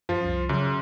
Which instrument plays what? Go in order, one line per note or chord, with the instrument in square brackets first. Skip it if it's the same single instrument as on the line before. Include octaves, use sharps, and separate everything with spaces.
[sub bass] F#2 [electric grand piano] F3 F4
[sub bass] C2
[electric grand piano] F#2 [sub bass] C#3